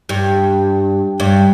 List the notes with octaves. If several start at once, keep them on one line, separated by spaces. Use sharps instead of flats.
G2
G2